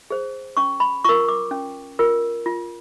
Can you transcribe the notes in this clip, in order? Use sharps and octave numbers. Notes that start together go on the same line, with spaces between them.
G#4 C5
C#4 C#6
B5
F4 A#4 C#6
D6
C#4
F4 A#4
F4